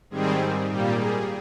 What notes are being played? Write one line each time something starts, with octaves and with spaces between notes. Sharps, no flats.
G#2 D#3 G3 C4 G#4
A#2 G3 A#3 G4
G#4